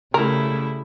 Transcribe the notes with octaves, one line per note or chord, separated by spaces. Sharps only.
C#3 G3 A3 E4 A#4